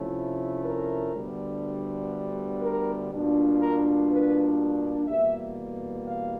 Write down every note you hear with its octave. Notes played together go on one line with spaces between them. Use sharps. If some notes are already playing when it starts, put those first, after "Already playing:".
Already playing: C3 F3 A3 C#4 E4
A#4
D2 D3 G3 B3
A#4
B2 G3 A#3 D4 F4
A#4
B4
E2 B2 G3 A#3 E5
F5